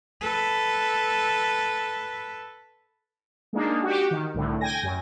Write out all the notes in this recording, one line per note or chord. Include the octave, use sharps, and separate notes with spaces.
A4 B4
G#3 A#3 D4 D#4
F#4 G4
D#3
C2 A2 D3
G5 G#5 A#6
F#2